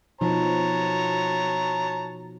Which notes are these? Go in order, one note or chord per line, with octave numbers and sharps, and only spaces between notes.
B2 F3 D#4 C#5 A5 A#5